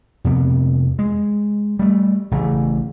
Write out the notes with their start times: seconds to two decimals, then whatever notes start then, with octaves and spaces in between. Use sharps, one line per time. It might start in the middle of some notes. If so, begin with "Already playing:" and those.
0.24 F2 C3 B3
0.99 G#3
1.79 G3 A3
2.31 A1 C#3 A3